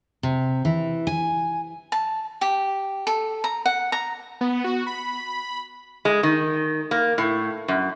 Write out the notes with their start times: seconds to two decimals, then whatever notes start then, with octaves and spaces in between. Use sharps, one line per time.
0.23 C3
0.65 E3
1.07 G#5
1.92 A5
2.41 G4
3.07 A4
3.44 A#5
3.66 F#5
3.92 A#5
4.41 B3
4.64 F#4
4.87 B5
6.05 G#3
6.23 D#3
6.91 A#3
7.18 A2
7.68 F#2